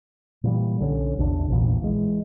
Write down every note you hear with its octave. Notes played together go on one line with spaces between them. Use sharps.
A#2 E3 F#3 G3
B1 D3 D#3 C#4
A#1 E2 C3 D4
A#1 E2 A#2 E3
E3 G#3